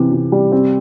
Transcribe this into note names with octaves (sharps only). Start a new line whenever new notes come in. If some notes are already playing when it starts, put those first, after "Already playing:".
Already playing: C3 E3
C3
G3
C4